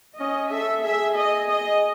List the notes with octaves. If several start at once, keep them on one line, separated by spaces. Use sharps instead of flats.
C#4 D#5
A4 E5
G#4 E5
D#5
D#5